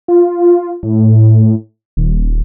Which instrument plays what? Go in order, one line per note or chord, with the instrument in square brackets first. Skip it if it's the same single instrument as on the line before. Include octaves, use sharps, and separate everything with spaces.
[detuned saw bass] F4
A2
D#1